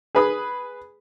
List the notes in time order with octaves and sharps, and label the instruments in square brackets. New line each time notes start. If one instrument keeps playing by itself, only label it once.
[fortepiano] G#4 B4 D#6